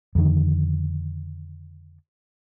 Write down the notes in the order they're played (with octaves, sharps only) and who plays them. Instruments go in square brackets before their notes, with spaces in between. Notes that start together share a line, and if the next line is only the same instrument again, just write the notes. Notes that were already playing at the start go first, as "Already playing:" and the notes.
[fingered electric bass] F2 D3 D#3